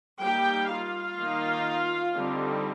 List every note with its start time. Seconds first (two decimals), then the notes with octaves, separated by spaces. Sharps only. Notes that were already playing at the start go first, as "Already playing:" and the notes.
0.23 G3 A#3 D#4 G4 G5
0.70 F4 F5
1.18 D#3 A#3 D#4
2.15 D3 G3 C4 D#4